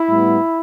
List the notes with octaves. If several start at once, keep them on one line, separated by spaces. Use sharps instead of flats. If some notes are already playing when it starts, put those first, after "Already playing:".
Already playing: E4
A2 G3 B3